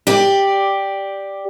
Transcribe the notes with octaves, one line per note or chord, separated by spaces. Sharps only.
G4 D5